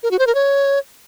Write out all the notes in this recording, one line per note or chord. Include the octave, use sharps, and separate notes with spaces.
A#4
F#4
C5
A#4
C#5